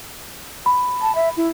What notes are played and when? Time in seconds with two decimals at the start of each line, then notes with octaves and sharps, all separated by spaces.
0.66 B5
1.02 A5
1.15 E5
1.37 E4